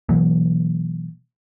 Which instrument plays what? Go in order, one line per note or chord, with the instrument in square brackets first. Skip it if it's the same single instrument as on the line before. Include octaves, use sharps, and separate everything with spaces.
[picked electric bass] B2 E3 F#3 A#3